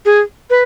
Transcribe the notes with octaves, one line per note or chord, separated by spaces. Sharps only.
G#4
B4